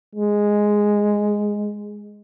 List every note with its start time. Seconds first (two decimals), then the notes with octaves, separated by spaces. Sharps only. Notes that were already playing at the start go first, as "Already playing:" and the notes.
0.16 G#3